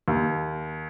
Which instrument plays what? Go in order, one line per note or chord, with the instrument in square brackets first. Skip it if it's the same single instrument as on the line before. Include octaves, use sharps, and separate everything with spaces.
[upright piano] D#2